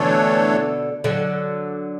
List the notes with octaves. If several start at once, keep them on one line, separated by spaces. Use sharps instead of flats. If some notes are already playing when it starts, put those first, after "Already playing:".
Already playing: B2 D3 E3 A3 D4 A4 C#5
D3 F#3